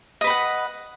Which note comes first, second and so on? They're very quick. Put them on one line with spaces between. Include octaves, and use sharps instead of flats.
D#5 B4 B5 F#5